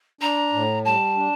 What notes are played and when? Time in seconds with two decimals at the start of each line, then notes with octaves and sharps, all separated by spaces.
0.21 D4 A#5
0.53 A2
0.85 G3 A5
1.16 D4